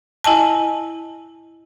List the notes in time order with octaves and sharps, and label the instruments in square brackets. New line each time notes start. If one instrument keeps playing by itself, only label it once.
[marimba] E4 D#5 G#5 A5